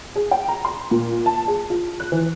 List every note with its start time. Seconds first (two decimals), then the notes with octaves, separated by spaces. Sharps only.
0.16 G#4
0.31 G5
0.48 A#5
0.65 C6
0.91 A#2
1.26 A5
1.48 G#4
1.70 F4
2.00 F#6
2.12 E3